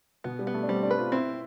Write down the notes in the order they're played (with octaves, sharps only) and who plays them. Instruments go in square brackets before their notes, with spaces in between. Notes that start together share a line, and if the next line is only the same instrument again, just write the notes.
[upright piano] B2 [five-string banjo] B3
[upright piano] G3
[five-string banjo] B3
[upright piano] A3
D4
[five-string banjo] G3 [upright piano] C4
[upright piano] D4
[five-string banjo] B4
[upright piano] F4
[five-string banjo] C4 [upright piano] E4